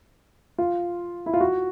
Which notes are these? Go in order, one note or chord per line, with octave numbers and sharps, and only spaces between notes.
F4
E4
F4
F#4